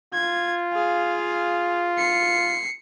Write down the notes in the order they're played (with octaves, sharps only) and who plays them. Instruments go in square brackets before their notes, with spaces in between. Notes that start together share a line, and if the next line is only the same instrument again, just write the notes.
[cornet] F4 [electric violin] G#6
[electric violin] G#4 F5
C7 C#7